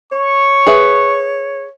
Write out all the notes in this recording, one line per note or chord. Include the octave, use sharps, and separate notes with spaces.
C#5 C#6
G#4 B4 E5